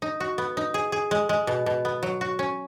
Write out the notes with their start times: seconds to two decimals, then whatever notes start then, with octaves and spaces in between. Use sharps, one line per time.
0.02 D#4
0.20 F#4
0.38 B3
0.57 D#4
0.74 G#4
0.92 G#4
1.11 G#3
1.29 G#3
1.47 B2
1.66 B2
1.85 B3
2.03 F#3
2.21 F#4
2.39 C#4